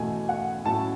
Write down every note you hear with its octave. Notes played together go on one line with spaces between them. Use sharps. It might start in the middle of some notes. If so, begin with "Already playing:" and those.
Already playing: E2 B2 A3 G#5
F#5
A2 F#3 C#4 E4 A5